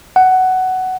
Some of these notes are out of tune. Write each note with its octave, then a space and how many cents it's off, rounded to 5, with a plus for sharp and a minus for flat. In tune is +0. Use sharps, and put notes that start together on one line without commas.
F#5 +10